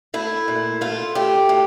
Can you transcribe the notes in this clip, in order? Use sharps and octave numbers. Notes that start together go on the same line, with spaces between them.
A3 E4
A#2
A3 F4
A3 G4
A2